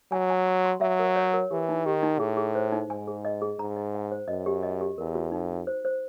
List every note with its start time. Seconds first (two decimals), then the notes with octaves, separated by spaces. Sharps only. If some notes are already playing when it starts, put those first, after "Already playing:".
0.12 F#3 G#5
0.30 G#5
0.47 C6
0.65 C6
0.81 F#3 E5
0.99 A#4
1.16 C#5
1.34 A#4
1.51 E3 G4
1.69 D#4
1.86 D#3 G4
2.03 D#4
2.20 A2 G#4
2.37 G#4
2.55 C5
2.72 D#4
2.90 G#2 G#5
3.08 G#4
3.25 D#5
3.42 G#4
3.59 G#2 A#5
3.77 D#5
3.94 F#5
4.12 C5
4.28 F#2 D#5
4.46 G4
4.63 D#5
4.81 G4
4.98 E2 A#4
5.15 F#4
5.32 F2 D#4
5.50 D#4
5.67 C5
5.85 C5